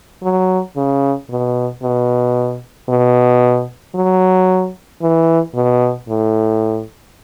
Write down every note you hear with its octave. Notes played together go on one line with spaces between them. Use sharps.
F#3
C#3
B2
B2
B2
F#3
E3
B2
A2